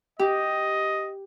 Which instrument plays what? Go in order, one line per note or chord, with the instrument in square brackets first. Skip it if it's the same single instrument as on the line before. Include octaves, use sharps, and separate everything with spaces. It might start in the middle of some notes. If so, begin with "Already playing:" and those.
[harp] G4 [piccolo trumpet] D#5